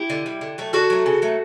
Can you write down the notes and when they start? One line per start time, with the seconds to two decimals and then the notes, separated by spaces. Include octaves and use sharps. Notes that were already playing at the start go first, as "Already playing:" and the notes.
Already playing: E4 G4
0.10 D3
0.26 G3
0.41 D3
0.58 F#3 A3
0.73 D3 F#4 A4
0.90 F#3 A3
1.06 C#3
1.22 F#3 A3